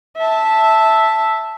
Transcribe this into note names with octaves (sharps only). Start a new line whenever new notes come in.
E5 A5